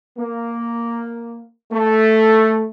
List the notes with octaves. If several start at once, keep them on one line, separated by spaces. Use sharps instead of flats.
A#3
A3